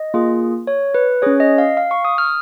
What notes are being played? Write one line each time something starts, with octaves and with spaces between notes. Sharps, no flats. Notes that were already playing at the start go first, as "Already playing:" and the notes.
Already playing: D#5
A#3 F4 G#4
C#5
B4
C#4 G#4 C#5
D#5
F5
F5
C#6
D#6
F6